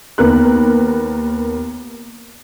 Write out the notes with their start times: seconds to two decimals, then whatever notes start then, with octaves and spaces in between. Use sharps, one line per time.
0.18 D#2 B3 A#4 B4 F#6